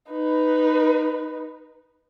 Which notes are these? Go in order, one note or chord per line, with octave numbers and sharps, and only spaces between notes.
D#4 B4